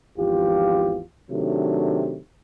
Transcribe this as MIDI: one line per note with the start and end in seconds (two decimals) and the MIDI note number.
0.19 1.01 32
0.19 1.01 40
0.19 1.01 53
0.19 1.01 65
0.19 1.01 67
1.31 2.18 48
1.31 2.18 51
1.31 2.18 54
1.31 2.18 57
1.31 2.18 62